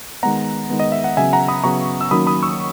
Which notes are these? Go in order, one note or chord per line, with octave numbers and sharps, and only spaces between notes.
D#3 G#3 B3 F#5 A#5
D#3 G#3 B3
D#5
E5
F#5
C#3 F#3 B3 E5 G#5
F#5 A#5
B5 D#6
C#3 F#3 B3 A#5 C#6
E6
D#3 F#3 A#3 C#4 B5 D#6
B5 D#6
C#6 E6